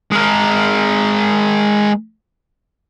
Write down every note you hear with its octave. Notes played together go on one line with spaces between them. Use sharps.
G#3 A#4